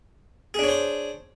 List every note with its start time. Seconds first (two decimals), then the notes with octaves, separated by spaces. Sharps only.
0.54 G#4
0.59 D4
0.64 C#5
0.68 C5